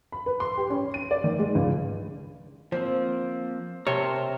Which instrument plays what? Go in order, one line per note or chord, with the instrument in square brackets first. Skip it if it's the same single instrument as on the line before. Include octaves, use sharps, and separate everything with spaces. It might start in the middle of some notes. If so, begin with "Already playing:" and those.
[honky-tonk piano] B5
B4
C6
G4
C#4
D#7
D5
D#3
G#3
C#2
[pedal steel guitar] F3 A#3 C4 [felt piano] C5
[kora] C3 [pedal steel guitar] A#4 A5 C6 [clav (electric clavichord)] C#5